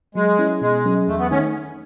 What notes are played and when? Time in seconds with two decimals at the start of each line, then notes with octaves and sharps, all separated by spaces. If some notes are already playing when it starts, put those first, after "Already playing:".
0.15 F#3 G#3
0.39 C#4 E4
0.61 B2 G#3
0.85 F#3 C#4 G#4
1.08 E2 A3
1.19 B3
1.31 D#3 A3 C#4 D#4